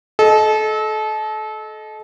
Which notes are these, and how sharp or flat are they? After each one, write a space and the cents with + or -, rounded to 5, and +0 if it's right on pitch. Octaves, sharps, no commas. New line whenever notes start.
A4 -30 D#5 +0